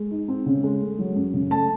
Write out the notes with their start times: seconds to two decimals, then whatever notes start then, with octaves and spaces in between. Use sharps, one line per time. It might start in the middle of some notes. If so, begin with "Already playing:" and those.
Already playing: G#3
0.11 D#4
0.28 C4
0.46 C#3
0.64 G#3
0.81 A3
0.99 F#3
1.16 F#2
1.34 C#3
1.51 A3 A5